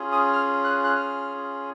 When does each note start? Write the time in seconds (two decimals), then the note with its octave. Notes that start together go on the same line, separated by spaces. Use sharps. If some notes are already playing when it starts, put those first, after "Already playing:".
Already playing: C#4 F4 G#4
0.12 D#6
0.33 F6
0.64 F#6
0.84 F#6
0.96 F6